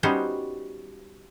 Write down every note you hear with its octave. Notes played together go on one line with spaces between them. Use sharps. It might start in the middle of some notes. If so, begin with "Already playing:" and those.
G3 B3 C#4 D#4 F#4 C5